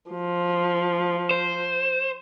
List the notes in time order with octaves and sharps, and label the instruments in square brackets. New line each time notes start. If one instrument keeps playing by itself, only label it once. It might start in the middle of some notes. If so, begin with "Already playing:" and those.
[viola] F3
[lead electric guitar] C5